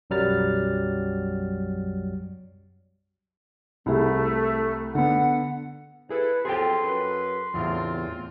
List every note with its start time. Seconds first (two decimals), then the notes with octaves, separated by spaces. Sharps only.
0.10 B1 F#2 F#3 G3 F6 A6
3.86 C2 A3 E4 G#4
4.95 D3 B3 F#5
6.10 E4 G#4 A4 B4
6.45 F3 F#3 C4 G#4 A4 G5 C6
6.82 F#2 B4
7.54 E2 A2 C4 D4 F4